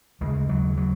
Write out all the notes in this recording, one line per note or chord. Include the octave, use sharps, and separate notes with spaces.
D#2 C#3 G#3
F#3
F#3